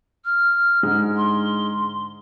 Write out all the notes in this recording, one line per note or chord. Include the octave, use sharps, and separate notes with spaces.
F6
G#2 D3 G#3
C6